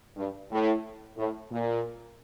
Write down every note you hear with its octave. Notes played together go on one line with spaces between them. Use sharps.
G2
A2
A2
A#2